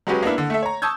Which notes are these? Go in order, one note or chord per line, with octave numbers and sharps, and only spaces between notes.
F#3 G#3 C#4 F#4 G4 B4
A#3 B3 D4 E4
D3
A3 A4 E5
C#5 A#5
A5 C#6 D#6 E6 G6 G#6